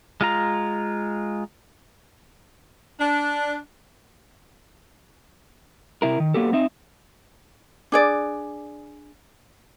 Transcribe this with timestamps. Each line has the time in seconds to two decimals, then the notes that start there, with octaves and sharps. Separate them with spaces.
0.21 G#3 F4 A#5
3.00 D4
6.02 C3 E4 A#4
6.20 D#3
6.34 F#3 A#3 B3 G4 A4
6.53 C4 D#4 E5
7.92 D4 G#4 D5